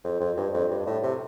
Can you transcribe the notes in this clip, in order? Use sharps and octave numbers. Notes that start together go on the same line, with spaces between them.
F2
F2
G2
F2
G2
A2
C3